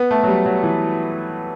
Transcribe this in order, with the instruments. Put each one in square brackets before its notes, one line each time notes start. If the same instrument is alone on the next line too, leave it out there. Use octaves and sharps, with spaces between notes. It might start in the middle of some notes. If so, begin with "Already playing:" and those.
Already playing: [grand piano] B3
A3
F#3
G3
F#3
E3